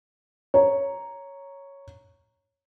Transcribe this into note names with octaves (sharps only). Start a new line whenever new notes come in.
C#5 A#5